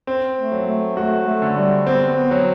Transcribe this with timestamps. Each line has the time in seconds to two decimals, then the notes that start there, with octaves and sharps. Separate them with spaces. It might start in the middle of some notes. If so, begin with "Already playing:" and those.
0.07 C4
0.37 A3
0.52 F#3
0.67 A3
0.96 A3 F#4
1.27 A3
1.42 D3
1.56 G3
1.87 B3 C4
2.16 B3
2.31 F#3